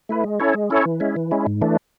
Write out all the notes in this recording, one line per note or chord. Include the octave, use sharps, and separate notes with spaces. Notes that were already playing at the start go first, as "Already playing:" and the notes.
A3 E4 B4
G#3
C#4 E4 A4 C#5
G#3
C#4 E4 A4 C#5
E3
G#3 C#4 E4
E3
G#3 C#4 E4
G#2
E3 A3 D4